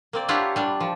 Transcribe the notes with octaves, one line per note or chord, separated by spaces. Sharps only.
A#3 C4 D5
D4 E4 F4 G4 C#5 F#5
G3 D4
F3